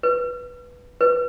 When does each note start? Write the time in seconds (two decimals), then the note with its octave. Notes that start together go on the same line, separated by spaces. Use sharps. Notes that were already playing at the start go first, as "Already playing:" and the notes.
0.03 B4
1.01 B4